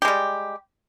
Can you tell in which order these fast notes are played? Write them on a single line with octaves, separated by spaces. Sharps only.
G4 G#3 G3